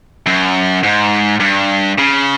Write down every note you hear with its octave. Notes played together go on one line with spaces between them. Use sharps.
F#2
G#2
G2
C#3